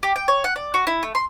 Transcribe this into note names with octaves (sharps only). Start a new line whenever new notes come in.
G4
G5
C#5
F#5
D5
F#4
E4
A3
C6